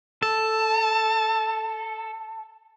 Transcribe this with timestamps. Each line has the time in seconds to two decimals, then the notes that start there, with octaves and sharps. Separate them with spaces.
0.23 A4 A5